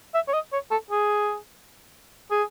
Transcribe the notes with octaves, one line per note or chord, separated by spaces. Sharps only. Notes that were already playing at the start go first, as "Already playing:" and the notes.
E5
C#5
D#5
C#5
A4
G#4
G#4